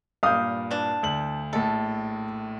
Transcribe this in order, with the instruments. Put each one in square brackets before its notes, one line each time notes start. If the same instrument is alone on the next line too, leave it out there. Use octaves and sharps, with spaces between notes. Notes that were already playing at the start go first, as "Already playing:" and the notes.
[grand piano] G2 A#2 G6 [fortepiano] F5 D#6
[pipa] E3 D4
[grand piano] D2 F#7
[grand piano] A#1 A2 [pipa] A4